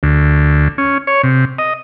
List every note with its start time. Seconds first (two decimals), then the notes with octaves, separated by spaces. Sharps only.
0.03 D2
0.78 C#4
1.07 C#5
1.23 C3
1.58 D#5